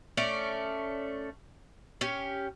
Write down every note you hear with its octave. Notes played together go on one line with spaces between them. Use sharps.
A3 C#4 D5
C#4 G4